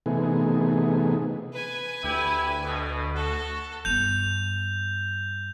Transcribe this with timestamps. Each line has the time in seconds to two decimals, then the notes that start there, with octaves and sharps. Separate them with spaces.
0.06 C3 E3 A3 B3 D#4 G#4
1.53 B4 G#5
2.04 D2 E4 G4
2.65 B2
3.15 F#4 A4
3.85 G2 B3 G6 F7